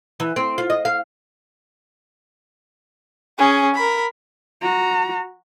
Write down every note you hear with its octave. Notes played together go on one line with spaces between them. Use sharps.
E3
C4
F4
D#5
F5
C#4 G#4
A#4 B5
F#4 A#5